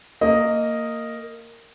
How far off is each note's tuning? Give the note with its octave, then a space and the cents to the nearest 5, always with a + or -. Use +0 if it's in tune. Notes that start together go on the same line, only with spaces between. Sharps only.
A#3 -20 D#5 +0